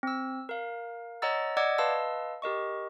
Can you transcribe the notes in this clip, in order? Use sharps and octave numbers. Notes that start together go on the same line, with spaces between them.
C4 E6
A#4 F5
C#5 D#5 F#5 A#5 E6 A6
D5 D#5 F#5 D6 E6 G#6
B4 D#5 F5 A5 C6 E6
G4 A#4 D#5 C#6